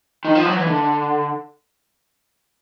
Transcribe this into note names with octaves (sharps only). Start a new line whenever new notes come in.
D#3
F3
F#3
E3
D3